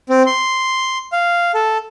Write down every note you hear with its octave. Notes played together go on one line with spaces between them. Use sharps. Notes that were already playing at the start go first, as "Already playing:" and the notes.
C4
C6
F5
A4